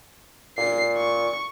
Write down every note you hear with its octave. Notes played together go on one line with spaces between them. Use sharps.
A#2 C7
C#6